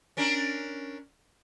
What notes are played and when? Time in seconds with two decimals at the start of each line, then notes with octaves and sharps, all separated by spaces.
0.17 C#4 D4 A#4